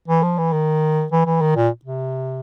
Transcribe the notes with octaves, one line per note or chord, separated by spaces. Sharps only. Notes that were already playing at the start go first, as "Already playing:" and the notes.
E3
F3
E3
D#3
E3
E3
D#3
A#2
C3